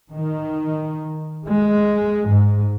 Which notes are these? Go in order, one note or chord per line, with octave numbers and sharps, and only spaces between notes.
D#3
G#3
G#2